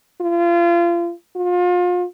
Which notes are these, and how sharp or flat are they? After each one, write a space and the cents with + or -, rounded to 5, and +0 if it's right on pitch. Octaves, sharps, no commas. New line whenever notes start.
F4 -30
F4 +35